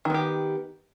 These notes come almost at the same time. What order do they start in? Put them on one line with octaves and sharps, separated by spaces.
D#3 B3 G4